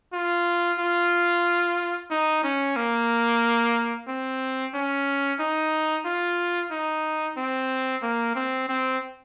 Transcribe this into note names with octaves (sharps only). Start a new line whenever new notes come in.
F4
F4
D#4
C#4
A#3
C4
C#4
D#4
F4
D#4
C4
A#3
C4
C4